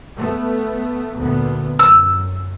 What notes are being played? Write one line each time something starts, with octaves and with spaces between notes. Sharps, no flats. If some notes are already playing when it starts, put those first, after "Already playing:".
A3 B3
D2 A#2 B3
F#2 E6